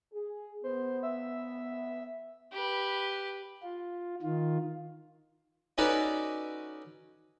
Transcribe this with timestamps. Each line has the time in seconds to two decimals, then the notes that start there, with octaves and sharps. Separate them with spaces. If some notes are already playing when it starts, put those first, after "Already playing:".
0.13 G#4
0.64 B3 C5
1.03 E5
2.53 G4 B4
3.63 F4
4.22 D#3 F4
5.78 C#4 D#4 F#4 A4 B4 D5